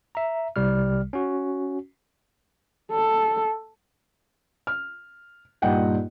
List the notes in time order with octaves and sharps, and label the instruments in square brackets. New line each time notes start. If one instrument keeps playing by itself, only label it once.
[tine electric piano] E5 A#5
C2 C3 G3 F6
C#4 F#4
[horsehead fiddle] A4
[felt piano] F6
G2 A#2 D#4 D#5 F#5 G5